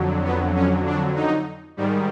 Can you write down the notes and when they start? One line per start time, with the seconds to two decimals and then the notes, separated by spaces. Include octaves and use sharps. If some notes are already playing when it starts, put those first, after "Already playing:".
Already playing: F2 D3 F#3
0.25 B3
0.55 C#4
0.86 D4
1.16 D#4
1.77 G#2 D#3 G3